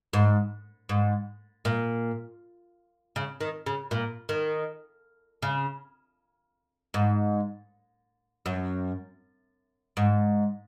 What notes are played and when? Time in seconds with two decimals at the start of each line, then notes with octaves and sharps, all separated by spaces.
0.13 G#2
0.89 G#2
1.65 A#2
3.16 C#3
3.41 D#3
3.66 C#3
3.91 A#2
4.29 D#3
5.42 C#3
6.94 G#2
8.46 F#2
9.97 G#2